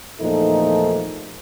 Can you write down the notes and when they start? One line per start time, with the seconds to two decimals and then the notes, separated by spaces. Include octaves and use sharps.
0.21 E2 A#2 F3 A3 D#4 A4